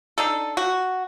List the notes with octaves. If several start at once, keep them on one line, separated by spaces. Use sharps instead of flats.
D4 D#4 A4
F#4